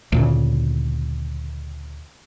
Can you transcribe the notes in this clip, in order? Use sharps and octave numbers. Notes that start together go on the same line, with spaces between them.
D2 A#2 C#3